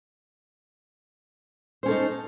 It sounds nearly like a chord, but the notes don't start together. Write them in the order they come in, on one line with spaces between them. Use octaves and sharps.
C5 C#4 A4 D#4